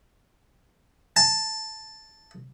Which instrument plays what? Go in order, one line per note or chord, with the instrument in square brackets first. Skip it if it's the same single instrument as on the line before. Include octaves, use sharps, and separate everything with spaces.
[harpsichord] A5